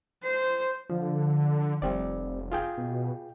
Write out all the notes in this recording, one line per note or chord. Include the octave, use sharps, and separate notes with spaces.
C5
D3 F3
F1 G3 C4 D5
F4 G#4 G5
B2